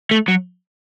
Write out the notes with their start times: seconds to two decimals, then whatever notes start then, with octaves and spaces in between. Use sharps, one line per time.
0.11 A3
0.28 F#3